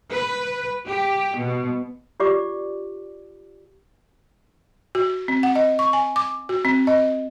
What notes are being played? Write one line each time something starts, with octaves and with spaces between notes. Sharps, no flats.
B4
G4
B2
F4 G4 D5 D6
F#4
C4
F#5
D#5
C#6
G#5
D6
F#4
C4
D#5